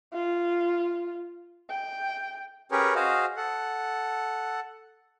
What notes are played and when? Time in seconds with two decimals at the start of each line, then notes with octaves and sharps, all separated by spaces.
0.13 F4
1.70 G5
2.71 C#4 G4 G#4 A#4 B4 C#5
2.95 F#4 G#4 C5 D#5 F5
3.37 A4 F#5